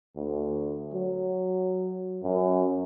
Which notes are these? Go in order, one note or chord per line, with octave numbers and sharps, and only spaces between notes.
D2
F#3
F#2